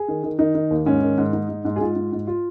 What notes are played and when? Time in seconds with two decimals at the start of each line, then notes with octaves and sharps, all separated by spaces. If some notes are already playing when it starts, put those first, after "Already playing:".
Already playing: G#4
0.08 D#3
0.24 D#3
0.39 D#3 D#4
0.55 D#3
0.71 D#2
0.86 G#2 C#4
1.02 D#3
1.18 G#2
1.33 G#2 D#4
1.49 G#2
1.65 G#2
1.76 G#4
1.81 G#2 F4
1.96 G#2
2.12 G#2
2.27 F4